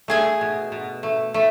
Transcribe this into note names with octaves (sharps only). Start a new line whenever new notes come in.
A3 G#4 G#5
B2
B2
A3
A3